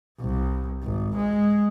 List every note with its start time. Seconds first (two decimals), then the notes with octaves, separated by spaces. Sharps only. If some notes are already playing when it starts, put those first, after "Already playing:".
0.20 C2
0.84 G#1
1.17 G#3